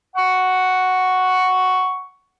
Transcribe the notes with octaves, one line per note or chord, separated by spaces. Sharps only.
F#5 C#6